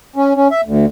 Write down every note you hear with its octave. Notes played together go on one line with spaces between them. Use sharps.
C#4
C#4
E5
D2